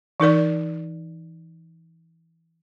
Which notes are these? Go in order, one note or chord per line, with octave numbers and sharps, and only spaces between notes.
E3 D#4 A#4 D5